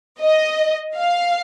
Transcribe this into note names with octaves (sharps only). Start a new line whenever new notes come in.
D#5
F5